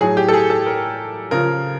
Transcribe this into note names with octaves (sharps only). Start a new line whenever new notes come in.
A2 F#3 G#4
G4
A4
G#4
A4
A#4
C#3 F3 A#4